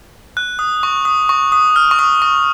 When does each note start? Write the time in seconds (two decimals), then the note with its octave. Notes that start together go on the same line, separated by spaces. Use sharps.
0.37 F#6
0.59 D#6
0.83 C#6
1.05 D#6
1.29 C#6
1.52 D#6
1.76 F6
1.91 C#6
1.99 D#6
2.22 C#6